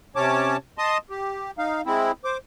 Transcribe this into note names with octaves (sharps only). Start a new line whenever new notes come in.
C3 C#4 C#5 A5 D6
D#5 A5 C6 D#6
G4
D#4 F5
G#3 C4 E4
C5 D6